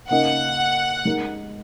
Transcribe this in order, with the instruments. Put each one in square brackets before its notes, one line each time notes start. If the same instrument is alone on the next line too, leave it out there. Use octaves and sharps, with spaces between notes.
[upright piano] C#3 A#3 D#4 A#4 D#5 [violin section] F#5
[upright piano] G#3 D#4 A#4